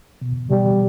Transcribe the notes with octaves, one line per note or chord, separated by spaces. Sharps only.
B2
B2 G3